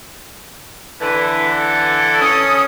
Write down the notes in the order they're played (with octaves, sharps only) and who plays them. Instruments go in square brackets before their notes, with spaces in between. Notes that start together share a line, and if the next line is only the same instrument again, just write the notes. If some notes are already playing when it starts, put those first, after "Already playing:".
[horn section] D3 E3 [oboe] B4
[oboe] A4
[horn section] C#4 [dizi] D#6